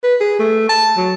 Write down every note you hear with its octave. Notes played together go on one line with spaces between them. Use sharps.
B4
G#4
A3
A5
F#3